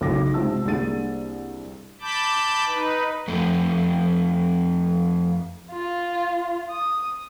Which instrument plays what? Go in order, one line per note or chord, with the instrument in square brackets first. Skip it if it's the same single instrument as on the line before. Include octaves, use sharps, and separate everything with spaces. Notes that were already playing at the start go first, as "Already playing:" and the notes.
[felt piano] B1 C#3 C#4 E4 D6 A#6
G#2 C3 F4 A5 E6
C2 A#3 D4 G#4 A6 D#7
[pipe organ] A5 B5 D6 G6
D#4 B4
[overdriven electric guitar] F2 A3
[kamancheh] F4
D#6